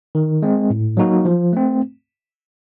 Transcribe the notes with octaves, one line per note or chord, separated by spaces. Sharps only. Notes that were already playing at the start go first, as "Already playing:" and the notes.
D#3
G#3 C4
A2
F#3 A#3 D#4 F#4
F3
A3 C4